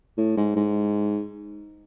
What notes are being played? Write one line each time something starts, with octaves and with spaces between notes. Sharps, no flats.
A2
G#2
G#2